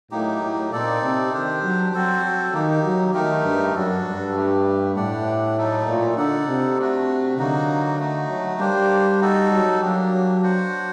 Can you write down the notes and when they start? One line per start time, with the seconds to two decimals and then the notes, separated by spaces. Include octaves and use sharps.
0.11 A2 F#3 A#3 D#4 G4
0.42 A2
0.71 A#2 C4 D#4 A4 D5
1.02 C3
1.32 D#3 D4 G4 C5
1.63 F#3
1.93 F#3 C4 F#4 A4 C5
2.23 F#3
2.53 D#3 A#3 D#4 G4
2.84 F#3
3.14 D#3 A3 D#4 G4 A#4
3.44 G2
3.75 F#2 D4 F#4 A4
4.05 G2
4.35 A3 D4 G4
4.96 A2 D4 G4 D5 F#5
5.57 F#3 A3 D#4 A4
5.87 A#2
6.17 D3 D#4 A4 D5 F#5
6.47 C3
6.78 A3 D4 F#4
7.38 D3 F#3 A#3 D#4 F#4
7.99 A3 D#4 F#4
8.30 F#3
8.59 G3 A#3 D4 G4 C5
9.21 D#4 F#4 A4
9.51 F#3
9.81 F#3 A#3 D4 G4
10.41 D4 F#4 C5 F#5